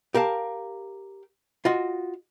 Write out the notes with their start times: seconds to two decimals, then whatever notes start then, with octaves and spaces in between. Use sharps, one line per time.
0.14 G4 A#4 F5 A5
1.65 F4 F#4 D#5